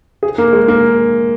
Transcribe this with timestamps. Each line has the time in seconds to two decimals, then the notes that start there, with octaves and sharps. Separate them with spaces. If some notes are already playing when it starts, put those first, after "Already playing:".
0.23 G#4
0.38 A#3
0.53 G#3
0.68 A#3